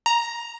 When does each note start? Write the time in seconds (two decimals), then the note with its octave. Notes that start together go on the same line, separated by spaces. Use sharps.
0.06 A#5